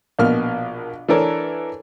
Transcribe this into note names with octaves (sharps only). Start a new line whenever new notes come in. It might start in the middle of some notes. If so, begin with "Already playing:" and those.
A#1 B2 A#3 F6
E3 D4 A4 A#4 C#5